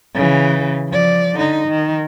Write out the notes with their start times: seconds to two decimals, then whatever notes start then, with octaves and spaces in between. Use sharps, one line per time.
0.15 C#3 E3
0.89 F3 D5
1.37 D3 D#4
1.68 D#3